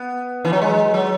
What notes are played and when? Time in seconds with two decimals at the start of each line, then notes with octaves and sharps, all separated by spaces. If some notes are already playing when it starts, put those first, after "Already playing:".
Already playing: B3
0.45 E3
0.53 F#3
0.62 G#3
0.94 F#3